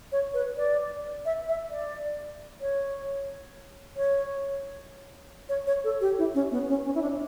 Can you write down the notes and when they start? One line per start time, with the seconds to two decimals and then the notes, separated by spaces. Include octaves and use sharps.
0.12 C#5
0.34 B4
0.57 D5
1.25 E5
1.48 E5
1.70 D5
2.61 C#5
3.96 C#5
5.49 C#5
5.67 C#5
5.84 A4
6.01 G4
6.18 E4
6.35 C#4
6.51 B3
6.69 C#4
6.85 C#4
6.95 E4
7.02 D4